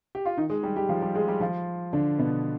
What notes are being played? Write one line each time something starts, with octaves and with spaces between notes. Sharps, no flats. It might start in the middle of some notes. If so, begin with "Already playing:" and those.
G4
F4
D#3 D#4
G#3 G#4
G3 G4
G3 G4
F3 F4
G3 G4
G#3 G#4
G3 G4
F3 F4
D3 D4
B2 B3